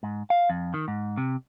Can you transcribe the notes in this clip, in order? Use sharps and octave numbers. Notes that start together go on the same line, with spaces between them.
G#2
F5
F2
D#3
G#2
C3